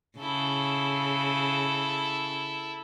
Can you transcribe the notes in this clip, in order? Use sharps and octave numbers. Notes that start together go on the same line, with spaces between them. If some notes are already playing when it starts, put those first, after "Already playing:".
C#3 E4 A4